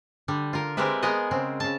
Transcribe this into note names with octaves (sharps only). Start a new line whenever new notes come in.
D3 G3
F4 A#4
G#3 C4 G4 A#4 B4 E5
G#3 B3 A#4 D#5 F#5
C#3 C4
C#3 A5